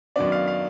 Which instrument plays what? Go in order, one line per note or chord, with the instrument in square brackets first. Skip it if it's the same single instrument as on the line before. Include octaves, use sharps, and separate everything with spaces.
[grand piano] F#2 D#3 F#3 B3 D4 D5
F5
F5